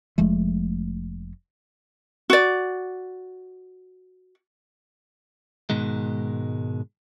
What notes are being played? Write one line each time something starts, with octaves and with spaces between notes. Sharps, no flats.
F1 F3 G#3 A3
F#4 D5
G#2 B2 D#3 G#3